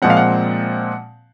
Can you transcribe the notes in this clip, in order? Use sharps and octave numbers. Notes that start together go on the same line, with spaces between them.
A#2 F3 G#3 C4 F#5
F5
F#5